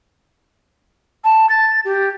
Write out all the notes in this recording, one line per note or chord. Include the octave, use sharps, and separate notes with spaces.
A5
A6
G4